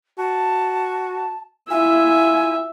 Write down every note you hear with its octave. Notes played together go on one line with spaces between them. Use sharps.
F#4 A5
E4 F4 E5 G#5